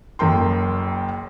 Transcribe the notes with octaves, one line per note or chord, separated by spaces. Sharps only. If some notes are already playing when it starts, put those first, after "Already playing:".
F#1 F#2 A#3 A#4 G5 C6